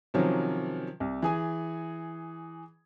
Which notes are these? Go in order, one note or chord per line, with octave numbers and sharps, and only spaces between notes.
C3 D#3 F3 F#3 C#4
C2
E3 G#4 G#5